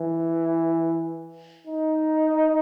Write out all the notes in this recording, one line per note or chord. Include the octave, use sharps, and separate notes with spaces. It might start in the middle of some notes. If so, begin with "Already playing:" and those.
Already playing: E3
D#4